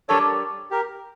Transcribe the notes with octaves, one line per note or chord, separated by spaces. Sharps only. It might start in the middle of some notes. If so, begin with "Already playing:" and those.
G3 D4 G4 A4 A#4 C#5 D5
G4 A#4